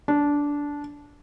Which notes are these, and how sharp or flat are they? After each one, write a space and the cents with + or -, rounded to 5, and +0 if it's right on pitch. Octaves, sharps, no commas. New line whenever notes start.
D4 -15